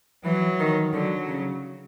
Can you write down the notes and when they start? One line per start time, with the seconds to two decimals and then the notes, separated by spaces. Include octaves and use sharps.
0.25 E3 F#3
0.59 D#3
0.93 D3 F#3
1.28 C#3